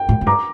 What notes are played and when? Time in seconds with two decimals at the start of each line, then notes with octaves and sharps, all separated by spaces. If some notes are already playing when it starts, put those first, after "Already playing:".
Already playing: G5
0.09 A2
0.21 A2
0.26 G2 A#5 D6